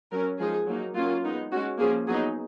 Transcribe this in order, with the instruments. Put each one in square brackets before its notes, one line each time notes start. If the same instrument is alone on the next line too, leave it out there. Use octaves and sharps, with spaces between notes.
[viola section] F#3 C#4 A#4
F3 G#3 D#4 G#4
F#3 A#3 D#4
F#3 A#3 C#4 F4
G#3 B3 D#4
G#3 C#4 F#4
F3 A#3 C#4 G#4
F#3 B3 D#4 G#4